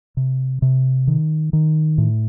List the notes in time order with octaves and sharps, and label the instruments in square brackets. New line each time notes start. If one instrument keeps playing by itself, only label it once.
[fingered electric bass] C3
C3
D#3
D#3
A2